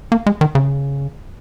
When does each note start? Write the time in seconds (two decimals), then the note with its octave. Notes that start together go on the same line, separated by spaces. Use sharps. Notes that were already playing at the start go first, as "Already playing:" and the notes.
0.12 A#3
0.26 G#3
0.41 D#3
0.55 C#3